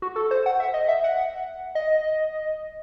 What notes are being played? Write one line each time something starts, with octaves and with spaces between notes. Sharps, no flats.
F#4
A4
C5
F#5
E5
D#5
E5
F#5
D#5